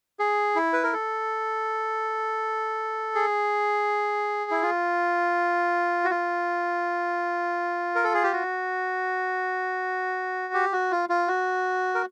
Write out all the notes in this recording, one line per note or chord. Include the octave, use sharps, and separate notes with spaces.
G#4
E4
B4
A#4
A4
G#4
E4
F4
F#4
F4
A#4
A4
G#4
G4
F#4
G4
F#4
F4
F4
F#4
A#4